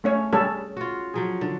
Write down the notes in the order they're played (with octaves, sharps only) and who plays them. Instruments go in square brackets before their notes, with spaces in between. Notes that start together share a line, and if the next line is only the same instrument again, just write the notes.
[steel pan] A3 C#4 C#5
[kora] C#3 [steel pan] G3 C#4 A4
[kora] F4 F#4
F3 F#3 G#4
D3